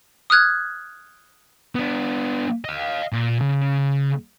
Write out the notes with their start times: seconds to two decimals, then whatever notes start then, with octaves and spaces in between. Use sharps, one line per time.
0.30 D#6 F6 F#6 G#6
1.75 B3 D4
2.65 D#5 F5
3.12 A#2
3.41 C#3